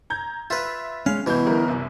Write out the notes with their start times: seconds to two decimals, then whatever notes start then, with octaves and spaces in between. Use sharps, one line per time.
0.10 A#5 G6 G#6
0.50 F4 B4 E5
1.06 G#3 C#4 F5
1.26 C2 B2 E3 E4 G6
1.46 G1 A#4
1.68 C2 F#2